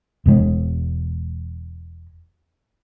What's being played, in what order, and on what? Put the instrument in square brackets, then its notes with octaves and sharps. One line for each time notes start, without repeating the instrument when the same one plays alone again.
[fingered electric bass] E1 B2 G#3